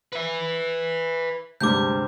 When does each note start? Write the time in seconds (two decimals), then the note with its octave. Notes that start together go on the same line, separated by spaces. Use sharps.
0.13 B4 E5
1.61 D2 G2 C3 G3 G#3 D6 G6